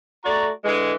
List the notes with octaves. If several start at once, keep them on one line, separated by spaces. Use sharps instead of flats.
A3 F#4 D5 A#5
D3 E3 G#3